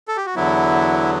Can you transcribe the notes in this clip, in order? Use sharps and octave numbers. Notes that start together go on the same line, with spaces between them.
A4
G4
F#4
E2 D3 F#3 B3 E4